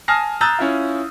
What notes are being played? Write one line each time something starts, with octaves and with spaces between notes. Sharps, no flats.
G#5 A5 D#6 F6 A#6 C7
A#5 D#6 E6 F#6 G6 A6
C#4 E4 F4